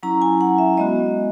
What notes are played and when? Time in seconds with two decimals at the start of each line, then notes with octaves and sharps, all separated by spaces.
0.03 F#3 C#4 E4 A#5
0.22 G#5
0.41 F#5
0.58 E5
0.77 G#3 B3 F#4 D#5